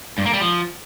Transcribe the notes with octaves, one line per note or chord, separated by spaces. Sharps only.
G2
A#3
G3
F3